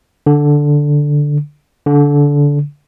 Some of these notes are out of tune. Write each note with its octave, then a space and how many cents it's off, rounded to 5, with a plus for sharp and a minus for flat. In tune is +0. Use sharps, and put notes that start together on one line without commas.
D3 +0
D3 -20